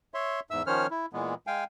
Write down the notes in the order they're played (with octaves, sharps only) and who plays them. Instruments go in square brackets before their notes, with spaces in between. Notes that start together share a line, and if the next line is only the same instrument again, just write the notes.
[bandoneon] C#5 E5 C6
E2 G#2 E5 E6
D#3 F3 C#4 C5 C#5 F6
E4
A#2 E3 G#3 B3
G#3 F5 G5 G#5